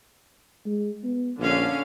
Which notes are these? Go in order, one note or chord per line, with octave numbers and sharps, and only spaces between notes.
G#3
B3
A#1 D3 C#4 F5